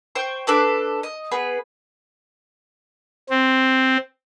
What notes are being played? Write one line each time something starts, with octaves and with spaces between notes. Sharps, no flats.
C5 G5 C#6
D4 A4 B4 D6
D#5
B3 G#4 B4
C4